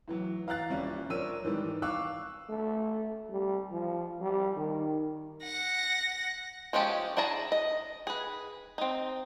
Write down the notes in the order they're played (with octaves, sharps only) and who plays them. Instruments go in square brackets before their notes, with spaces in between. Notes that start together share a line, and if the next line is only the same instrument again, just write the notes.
[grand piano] A2 E3 F#3
E3 F5 A#5 F#6 A6
D#1 G3 C#4 E5
F3 D4 A#4 C#5 E6 D#7
G#2 D#3 E3 G3
F5 C#6 D6 E6 F#6
[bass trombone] A3
G3
F3
G3
D#3
[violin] F#5 A#6
[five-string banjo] F3 G#3 C#4 G4 A5
D4 E4 G#4 A5 A#5
D#5
G#4 B4
C4 D#4